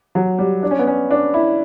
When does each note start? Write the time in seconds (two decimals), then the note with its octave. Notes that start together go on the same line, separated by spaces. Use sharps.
0.15 F#3
0.39 G3
0.63 D4
0.71 C#4
0.79 B3
0.87 C#4
1.11 D4
1.34 E4